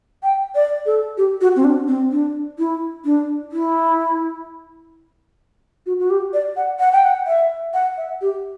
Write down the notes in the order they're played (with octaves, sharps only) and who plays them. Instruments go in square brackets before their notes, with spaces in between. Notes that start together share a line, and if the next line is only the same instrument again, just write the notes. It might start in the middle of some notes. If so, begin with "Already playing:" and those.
[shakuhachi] G5
D5
A4
G4
F#4
C4
D4
C4
D4
E4
D4
E4
F#4
F#4
G4
D5
F#5
F#5
G5
F#5
E5
F#5
E5
G4